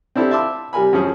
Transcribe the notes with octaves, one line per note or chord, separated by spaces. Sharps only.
C4 D4 E4 G4 A4
E5 A5 B5 C6 D6 E6
C3 G3 A#4 G#5 B5
F#2 F3 C#4 G#4